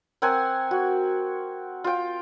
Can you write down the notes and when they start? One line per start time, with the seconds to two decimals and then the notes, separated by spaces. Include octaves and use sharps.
0.22 C4 A#4 F#5 G#5
0.71 F#4
1.84 F4 G5